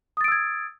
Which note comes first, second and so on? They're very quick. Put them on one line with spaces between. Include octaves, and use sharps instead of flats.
D#6 A6 D7 E6 G#6